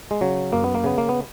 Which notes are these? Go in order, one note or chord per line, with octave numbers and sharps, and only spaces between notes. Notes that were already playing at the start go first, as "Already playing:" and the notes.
G#3
C#3 F#3
F#2 A#3
B3
A#3
C#3 B3
A#3
B3